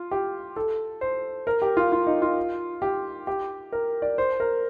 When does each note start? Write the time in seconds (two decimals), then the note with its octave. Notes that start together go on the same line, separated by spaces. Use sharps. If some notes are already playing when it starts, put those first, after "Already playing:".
Already playing: F4
0.11 G4
0.56 A4
1.01 C5
1.47 A#4
1.62 G4
1.77 F4
1.92 F4
2.07 D#4
2.22 F4
2.82 G4
3.27 G4
3.72 A#4
4.02 D5
4.18 C5
4.40 A#4